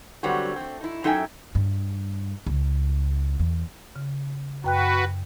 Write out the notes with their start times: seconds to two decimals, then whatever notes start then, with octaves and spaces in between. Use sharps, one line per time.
0.23 D3 F#3 G3 B3 C4 F#4
0.56 A3 C4
0.81 D#4 E4
1.04 F#2 D#4 A4 E5 G5 G#5
1.55 G2
2.47 C#2
3.39 E2
3.96 C#3
4.64 F#2 F#4 B4 G5 F#6